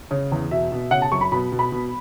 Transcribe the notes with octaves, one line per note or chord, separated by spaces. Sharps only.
C#3
E2
B2 E5
B2
C#3 F#5
A5
F#2 C#6
B5
B2 B5
B2
B5
B2